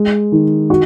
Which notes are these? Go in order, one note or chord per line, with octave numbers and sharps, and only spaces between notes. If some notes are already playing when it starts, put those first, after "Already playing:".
Already playing: G#3
D#3
F#4